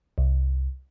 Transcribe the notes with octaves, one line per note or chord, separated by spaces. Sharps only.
C2